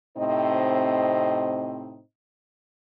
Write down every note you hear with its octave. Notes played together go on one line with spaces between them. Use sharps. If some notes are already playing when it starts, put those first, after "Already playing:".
A2 C3 C4 D#4 C5 D#5